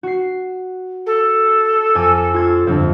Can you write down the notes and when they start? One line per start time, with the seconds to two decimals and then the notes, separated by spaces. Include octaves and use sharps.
0.03 F#4 C7
1.06 A4
1.95 F2 G#5 D6
2.34 F4 G#6 A6
2.67 G1 F2